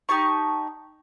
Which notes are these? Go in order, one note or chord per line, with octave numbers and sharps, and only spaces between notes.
D#4 G4 A5 C#6